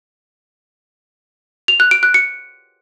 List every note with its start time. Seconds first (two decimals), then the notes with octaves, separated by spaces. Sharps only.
1.68 F7
1.80 F#6
1.91 D7
2.03 F#6
2.14 C#7